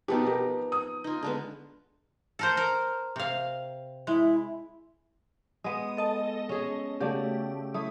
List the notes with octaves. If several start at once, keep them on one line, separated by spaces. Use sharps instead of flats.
B2 F3 B3 D#4 G4
G4 A#4
D#6
D#4 F4
D3 G#3 B3
A4 A#4 C5
A#4
C3 F5
G#3 E4 E5
G#3 B3 D#6 D#7
A4 D#5 A5
C#4 G#4
C#3 A3 F#4 G4 D5
A3 E4 D#6